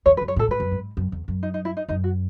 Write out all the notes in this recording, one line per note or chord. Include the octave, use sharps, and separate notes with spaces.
E2 C#5
B4
F#2
C#5
A2 A4
G#2 B4
F#2
G#2
F#2
E2
F#2
D#4
D#4
E4
D#4
F#2 D#4
F#4